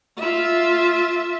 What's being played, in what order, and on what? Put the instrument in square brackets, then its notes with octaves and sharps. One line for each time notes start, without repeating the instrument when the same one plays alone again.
[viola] F4 E5